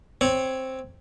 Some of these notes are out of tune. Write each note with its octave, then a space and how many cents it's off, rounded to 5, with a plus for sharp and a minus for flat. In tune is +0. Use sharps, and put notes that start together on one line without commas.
C4 +5 C#5 +0